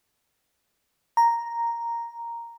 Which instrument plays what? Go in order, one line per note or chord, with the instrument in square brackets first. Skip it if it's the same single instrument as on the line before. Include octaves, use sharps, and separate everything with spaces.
[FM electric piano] A#5